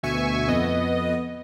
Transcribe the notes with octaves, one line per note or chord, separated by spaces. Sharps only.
D2 B2 E5 G#5 C#6
F2 B3 D#5